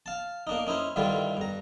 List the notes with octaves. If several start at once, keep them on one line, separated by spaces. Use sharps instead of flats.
F5 A5
A#3 D4 D#4
C#4 D#4 E4 C5
G2 D3 D#3 G3 E4 F4
G2 A#5